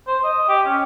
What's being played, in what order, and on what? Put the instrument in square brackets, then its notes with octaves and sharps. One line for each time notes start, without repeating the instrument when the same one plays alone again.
[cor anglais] C5
D#5
G4
C#4